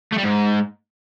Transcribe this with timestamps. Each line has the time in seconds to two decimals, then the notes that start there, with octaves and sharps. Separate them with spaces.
0.13 A3
0.18 G3
0.24 G#2